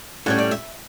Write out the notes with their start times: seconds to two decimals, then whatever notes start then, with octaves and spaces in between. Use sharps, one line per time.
0.26 A2 G3 C#4 F#5
0.39 D5
0.51 E5